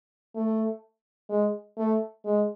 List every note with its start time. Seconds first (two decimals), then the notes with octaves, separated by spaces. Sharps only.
0.36 A3
1.30 G#3
1.78 A3
2.25 G#3